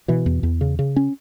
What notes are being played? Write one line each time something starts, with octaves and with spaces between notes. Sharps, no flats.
B2 E3
E2
E2
C#3
C#3
C#4